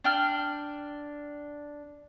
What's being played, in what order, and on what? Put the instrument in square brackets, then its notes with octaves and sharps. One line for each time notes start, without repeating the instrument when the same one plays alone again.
[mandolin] D4 G5 F6